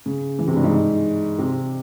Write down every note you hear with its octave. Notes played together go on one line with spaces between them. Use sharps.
C#3
E3
C3
G2
G#2
C3